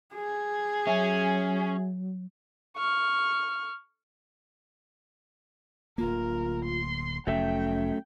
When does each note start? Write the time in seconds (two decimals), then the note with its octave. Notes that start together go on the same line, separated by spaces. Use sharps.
0.15 G#4
0.87 F#3 C#4 E5 G#5
2.77 C#6 F6
5.98 D1 D2 A#3 F4 A#4
6.65 C6
7.27 F1 F#3 A3 C#4 E5 G5